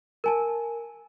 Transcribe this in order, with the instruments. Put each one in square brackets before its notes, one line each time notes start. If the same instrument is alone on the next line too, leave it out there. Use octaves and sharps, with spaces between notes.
[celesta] A#4 G#5 A5